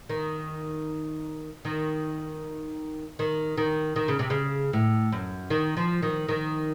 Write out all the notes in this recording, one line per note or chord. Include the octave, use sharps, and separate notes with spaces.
D#3
D#3
D#3
D#3
D#3
C#3
C3
C#3
A2
F#2
D#3
F3
D#3
D#3